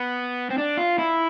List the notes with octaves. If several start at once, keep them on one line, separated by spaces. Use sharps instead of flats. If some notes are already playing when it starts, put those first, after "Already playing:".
Already playing: B3
C4
D4
F4
E4